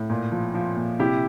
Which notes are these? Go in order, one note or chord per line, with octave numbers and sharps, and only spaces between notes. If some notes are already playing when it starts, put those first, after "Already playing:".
Already playing: A2
A#2
F3
F3
A#2
C3 E4 G4